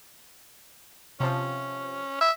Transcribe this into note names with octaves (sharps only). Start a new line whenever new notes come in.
C3 F3 C#4
E5